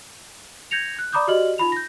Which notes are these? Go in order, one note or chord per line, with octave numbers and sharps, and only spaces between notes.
G6 G#6 A#6 C#7 F7
F#6
D5 A#5 B5 D6 D#6 G6
F#4 G4 D5 D#5 F6 F#7
D#4 F4 B5 F7
G6 A#6